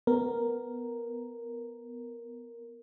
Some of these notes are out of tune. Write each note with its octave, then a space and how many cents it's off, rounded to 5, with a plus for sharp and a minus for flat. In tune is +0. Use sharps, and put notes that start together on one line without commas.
B3 +0 A#4 +0